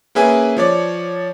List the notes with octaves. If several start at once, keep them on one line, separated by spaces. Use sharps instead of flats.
A#3 C#4 G#4 B4 E5 G#5
F3 C#5 D5